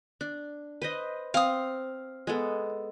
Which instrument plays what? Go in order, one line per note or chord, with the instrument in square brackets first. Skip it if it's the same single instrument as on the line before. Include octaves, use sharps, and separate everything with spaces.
[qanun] D4
B4 C5 D#5
[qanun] C4 [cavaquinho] F5 D#6
[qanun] G#3 B3 A4